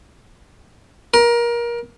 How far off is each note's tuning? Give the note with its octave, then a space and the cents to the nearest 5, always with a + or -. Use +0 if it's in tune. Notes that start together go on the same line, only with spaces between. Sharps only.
A#4 +25